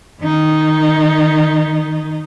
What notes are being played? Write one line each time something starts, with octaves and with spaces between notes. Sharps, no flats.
D#3 D#4